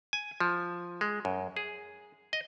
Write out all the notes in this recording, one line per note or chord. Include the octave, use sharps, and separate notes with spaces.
G#5
F3
G#3
F#2
G#4
D#5